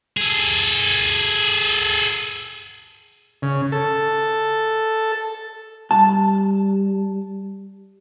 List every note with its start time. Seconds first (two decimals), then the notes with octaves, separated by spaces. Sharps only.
0.17 G#4 A4
3.42 C#3
3.72 A4
5.91 G3 A5